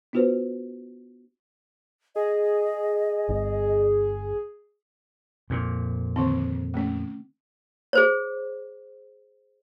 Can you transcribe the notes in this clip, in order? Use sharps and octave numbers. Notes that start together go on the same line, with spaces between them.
B3 D4 F4 F#4 B4 C5
G#4 D#5
G1
F2 A#2
D3 D#3 C4
A3 C#4
G#4 C5 C#5